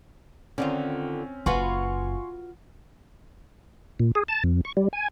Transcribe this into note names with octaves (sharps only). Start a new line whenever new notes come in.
D3 D#3 C4 C#4 F4
F#1 F4 F#4 B4 G#5 C6 C#6
A#2
G#4
A5
F2
C#6
G3
G#5